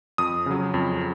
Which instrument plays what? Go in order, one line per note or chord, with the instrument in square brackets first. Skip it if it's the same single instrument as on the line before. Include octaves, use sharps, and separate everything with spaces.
[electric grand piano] F2 D#6
C#3 F#3
F2